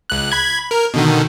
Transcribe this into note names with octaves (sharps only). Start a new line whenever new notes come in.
C#2 F#6
B5 G#6
A#4
B2 D3 D#3